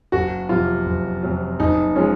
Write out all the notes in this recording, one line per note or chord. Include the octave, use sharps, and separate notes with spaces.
F#1 F#4
F2 C3 F#3 F4
F#1
F2 C3 F#3
F#1 D#4
F3 G#3 C#4